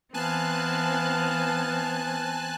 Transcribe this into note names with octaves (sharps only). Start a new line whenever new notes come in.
E3 B3 C4 F5 G#5 A5 F#6